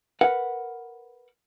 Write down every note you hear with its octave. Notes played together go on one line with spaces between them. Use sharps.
A#4 B4 F#5